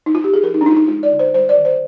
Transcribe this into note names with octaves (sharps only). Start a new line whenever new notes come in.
D#4
F4
G4
G#4
F3 A#4
D#4
D4
G#3 D#4 F4
D#4
G#3 F4
D5
D3
C5
G3 C5
D5
D#3
C5